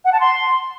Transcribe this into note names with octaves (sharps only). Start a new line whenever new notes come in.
F#5
A5
C6